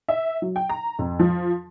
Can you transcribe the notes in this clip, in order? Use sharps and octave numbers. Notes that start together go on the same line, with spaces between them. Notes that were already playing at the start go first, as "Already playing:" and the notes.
E5
F#3
G5
A#5
F2
F3